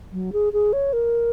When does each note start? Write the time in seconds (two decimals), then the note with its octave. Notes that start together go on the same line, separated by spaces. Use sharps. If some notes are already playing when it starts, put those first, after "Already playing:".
0.13 F#3
0.33 G#4
0.53 G#4
0.73 C#5
0.93 A#4